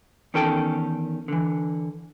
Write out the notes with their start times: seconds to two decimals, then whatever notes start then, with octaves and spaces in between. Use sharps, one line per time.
0.34 E2 D#3 C#4 A4 G5
1.28 D3 E3